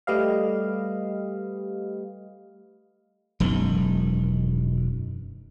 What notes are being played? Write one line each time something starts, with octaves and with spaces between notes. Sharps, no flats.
G3 A3 G4 B4 D#5 F5
E1 F#2 D#3